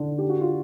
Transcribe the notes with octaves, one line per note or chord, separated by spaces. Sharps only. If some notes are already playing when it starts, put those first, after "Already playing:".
Already playing: D3 D4
G4
F#4
F4